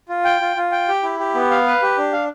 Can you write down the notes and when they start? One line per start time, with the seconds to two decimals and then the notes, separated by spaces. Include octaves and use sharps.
0.09 F4
0.25 G5
0.41 F4
0.56 F4
0.72 G5
0.88 G4
1.03 E4
1.19 G4
1.35 B3
1.51 F5
1.67 B4
1.82 G4
1.98 D4
2.12 F5